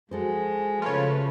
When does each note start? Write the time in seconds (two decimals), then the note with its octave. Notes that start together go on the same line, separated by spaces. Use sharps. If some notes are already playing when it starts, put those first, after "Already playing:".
0.11 F3 G#3 F#4 A4 C5
0.82 C#3 A3 F4 B4 C#5